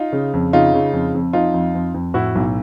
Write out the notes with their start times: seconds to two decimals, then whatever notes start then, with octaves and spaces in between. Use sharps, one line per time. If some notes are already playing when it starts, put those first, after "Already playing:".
Already playing: D#4 F4
0.12 C#3
0.33 F2
0.53 C#3 D#4 F4
0.74 C#3
0.93 F2
1.14 F2
1.33 F3 D#4 F4
1.54 F2
1.74 F2
1.94 F2
2.14 A2 E4 F#4
2.35 B1